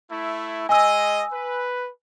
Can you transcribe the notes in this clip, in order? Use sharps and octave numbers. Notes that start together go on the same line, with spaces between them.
A3 E4
G#3 D#5 G#5 E6
B4